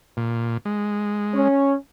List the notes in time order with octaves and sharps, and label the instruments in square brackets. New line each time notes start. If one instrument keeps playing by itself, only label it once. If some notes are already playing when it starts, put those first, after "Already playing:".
[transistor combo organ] A#2
G#3
[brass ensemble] C#4